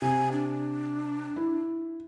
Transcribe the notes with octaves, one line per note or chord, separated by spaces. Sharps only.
C3 G#5
D4
E4